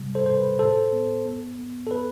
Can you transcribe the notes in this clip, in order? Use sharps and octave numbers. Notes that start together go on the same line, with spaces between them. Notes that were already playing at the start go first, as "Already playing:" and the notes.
Already playing: C3 G3
A4 C5
B2 C5
B4
A2 A4 C5
B3
B3
B3
A4
B3 B4